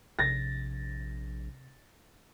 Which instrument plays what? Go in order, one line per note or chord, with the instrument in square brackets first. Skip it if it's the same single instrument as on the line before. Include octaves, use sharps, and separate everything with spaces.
[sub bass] A#1 [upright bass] C3 [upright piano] A6 A#6